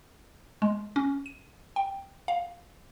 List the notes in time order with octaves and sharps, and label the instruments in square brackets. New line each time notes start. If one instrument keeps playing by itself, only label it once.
[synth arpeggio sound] G#3
C#4
D#7
G5
F5